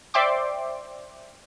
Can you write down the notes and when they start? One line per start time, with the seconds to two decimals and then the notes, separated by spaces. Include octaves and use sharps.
0.14 C5 D5 E5 G5 C6 D6